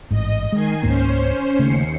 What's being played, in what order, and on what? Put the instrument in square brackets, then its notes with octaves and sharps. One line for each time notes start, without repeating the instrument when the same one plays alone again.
[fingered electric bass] A1 G#2 [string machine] D#5
[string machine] D#3 G#5 C7 [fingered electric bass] G#3
[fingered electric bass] C#2 G#2 A#3 [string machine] C#4 C5
[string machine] D#2 C7 C#7 [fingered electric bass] C#3 A3